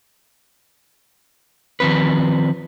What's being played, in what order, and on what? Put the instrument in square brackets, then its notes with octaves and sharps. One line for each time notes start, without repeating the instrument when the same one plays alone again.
[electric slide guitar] D#3 F3 C4 B4